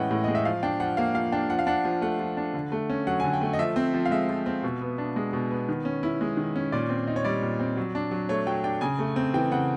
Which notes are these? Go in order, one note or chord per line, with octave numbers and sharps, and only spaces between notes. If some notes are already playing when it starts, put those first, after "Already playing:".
Already playing: A2 E3 G#3 C#4 D#5 F#5 G5
A2
G#3 D#5
E5
F3 F5
D4 G5
F3 F#5
A#3 F5
F3 F5
D4 G5
F3 F#5
F5
D4 F#5
F3
A3 F#5
F3
D4
D3
A3
C#4
F#3 F#5
D3 G#5
G5
A3
D#5
F3 E5
C4
F3
F5
G#3 E5
F3
C4
B2
B3
D4
G#3
B2
B3
D#3
C#4
E4
G#3
D#3
C#4
A#2 D5
C4
D#4
C#5
G3 D5
A#2
C4
F#3
D4
F#3
A3 C#5
F#3 G5
D4 G5
C#3 G#5
A3
C4
E3 G5
C#3 F#5